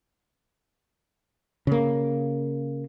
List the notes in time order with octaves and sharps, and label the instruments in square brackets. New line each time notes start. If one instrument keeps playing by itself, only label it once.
[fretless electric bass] C#3 A#3